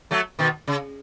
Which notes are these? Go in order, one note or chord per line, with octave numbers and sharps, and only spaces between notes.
F#3 A3
B2 D#3
C#3